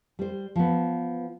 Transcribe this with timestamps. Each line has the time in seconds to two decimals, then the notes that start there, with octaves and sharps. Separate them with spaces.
0.19 G3 C5
0.56 F3 B3